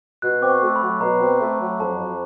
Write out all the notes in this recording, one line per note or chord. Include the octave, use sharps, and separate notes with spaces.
B2 F#6
C4 D6
C#6
A3
B5
F#3
B2 A#5
C4
A3
F#3
F2 A5
F2